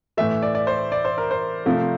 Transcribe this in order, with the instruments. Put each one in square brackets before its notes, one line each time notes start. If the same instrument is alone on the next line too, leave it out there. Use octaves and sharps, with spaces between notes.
[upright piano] A2 E3 A3 [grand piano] E5
[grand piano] D5
D5
C5
D5
C5
A#4
C5
[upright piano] C3 F3 A3